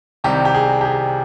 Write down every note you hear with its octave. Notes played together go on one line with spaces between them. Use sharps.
C2 C3 D#3 G3 G4
G4
G#4
G4
G#4